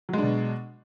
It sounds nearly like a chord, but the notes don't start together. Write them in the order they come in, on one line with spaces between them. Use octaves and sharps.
F#3 G#3 D4 B2